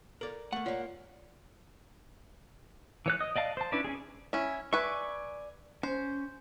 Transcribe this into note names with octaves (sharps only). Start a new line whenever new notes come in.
A4 A#4 D5
A3 A#3 F#5
A#3 F4 C#5 D5
E3 C#5 F#6
D#5
D5 D#5 F5 A5
C5 A5
C#4 D4 E4 B4
C#4 G#4
C#4 E4
B4 D5 E5 G#5 C#6
C#4 C5